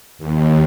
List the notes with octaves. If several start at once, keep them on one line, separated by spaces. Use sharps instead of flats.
D#2